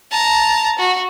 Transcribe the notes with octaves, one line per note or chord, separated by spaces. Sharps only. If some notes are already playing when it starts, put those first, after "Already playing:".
A5 A#5
F#4